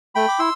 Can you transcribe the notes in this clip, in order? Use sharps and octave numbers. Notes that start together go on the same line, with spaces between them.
A3 G5 B5
D6
E4 C6 E6